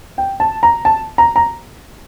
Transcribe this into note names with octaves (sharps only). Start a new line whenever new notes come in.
G5
A5
A#5
A5
A#5
A#5